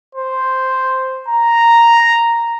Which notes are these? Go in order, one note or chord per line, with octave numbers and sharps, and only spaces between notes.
C5
A#5